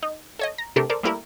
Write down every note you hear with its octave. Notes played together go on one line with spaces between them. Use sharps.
D#4
A4 C#5 D#5
A#5
C3 A3 D4 G4 A4 A#4
A4 A#4 C5 D5
G3 A3 A#3 E4 G4 A#4